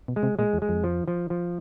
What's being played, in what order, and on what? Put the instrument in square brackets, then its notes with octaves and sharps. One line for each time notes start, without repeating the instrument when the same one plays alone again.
[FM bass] B2
[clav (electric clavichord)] G#3
[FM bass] C3
[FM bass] A#2 [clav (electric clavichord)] G#3
[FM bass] E2
[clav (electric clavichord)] G#3
[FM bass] F2
[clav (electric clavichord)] F3
F3
F3